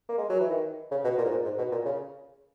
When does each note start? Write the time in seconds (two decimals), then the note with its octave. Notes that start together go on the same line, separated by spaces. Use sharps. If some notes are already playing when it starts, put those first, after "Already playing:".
0.09 A#3
0.18 G#3
0.29 F#3
0.40 E3
0.50 D#3
0.91 C#3
1.04 B2
1.17 A#2
1.25 G#2
1.31 A#2
1.44 G#2
1.58 B2
1.72 A#2
1.85 C#3